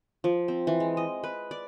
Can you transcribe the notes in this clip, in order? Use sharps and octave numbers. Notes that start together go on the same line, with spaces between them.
F3
C4
E3
G#3
D#5
B4
D5